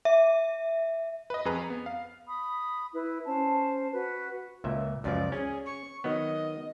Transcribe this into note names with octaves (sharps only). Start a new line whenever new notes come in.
E5
B4 D#5
F2 G#4 B4 A#5
B3
F5
B5 D#6
E4 B4
C#4 C5 A5
F#4 B4
C#2 A#2 E5
C#2 F#2 F3 D5
C#4 G#4
C#6
D#3 F#3 B3 D#5